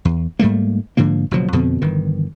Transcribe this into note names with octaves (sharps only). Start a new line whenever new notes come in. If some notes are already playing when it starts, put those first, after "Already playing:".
E2
G#2 G3 A3 A#3
G#2 D3 F3 A#3
F#1 B2 F3 F#3
F2 B2 D3 C4
G1 D#3 E3